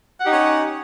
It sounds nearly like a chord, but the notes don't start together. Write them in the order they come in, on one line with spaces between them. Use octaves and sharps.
F#5 G4 D#4 C#4